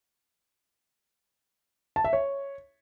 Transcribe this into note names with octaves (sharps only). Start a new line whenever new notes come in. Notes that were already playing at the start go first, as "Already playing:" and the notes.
A5
E5
C#5